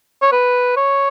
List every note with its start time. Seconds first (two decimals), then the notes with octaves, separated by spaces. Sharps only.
0.22 C#5
0.32 B4
0.77 C#5